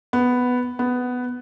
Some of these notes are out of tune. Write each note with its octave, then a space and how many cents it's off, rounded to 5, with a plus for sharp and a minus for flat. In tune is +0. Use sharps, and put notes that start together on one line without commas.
B3 +5
B3 +10